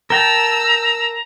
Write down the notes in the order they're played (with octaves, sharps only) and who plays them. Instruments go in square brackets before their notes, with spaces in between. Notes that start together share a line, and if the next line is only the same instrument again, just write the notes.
[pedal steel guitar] A#4 G5 A5 [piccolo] A#5 [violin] E6